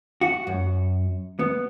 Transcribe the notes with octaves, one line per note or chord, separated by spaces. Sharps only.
F#4
F#2
B3